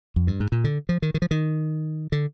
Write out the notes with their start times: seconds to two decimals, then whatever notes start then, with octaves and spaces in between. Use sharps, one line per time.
0.16 F2
0.27 G2
0.40 G#2
0.52 A#2
0.64 D3
0.89 F3
1.02 D#3
1.14 D#3
1.22 F3
1.31 D#3
2.12 D3